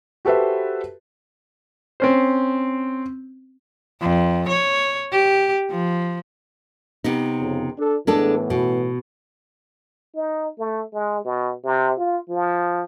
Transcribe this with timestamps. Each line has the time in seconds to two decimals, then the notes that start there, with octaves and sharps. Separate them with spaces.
0.25 F#4 G4 A4 B4 C5 E5
2.00 C4 C#4 C5
4.01 F2
4.49 C#5
5.12 G4
5.70 F3
7.04 C3 B3 D#4
7.40 F2 C#3
7.78 D4 A4
8.07 A2 E3 G#3 B3 D4 A4
8.50 B2
10.15 D#4
10.58 A3
10.93 G#3
11.25 B2
11.64 C3
11.98 F4
12.29 F3